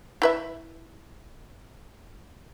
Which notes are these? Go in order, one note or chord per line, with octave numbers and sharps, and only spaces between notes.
E4 B4 E5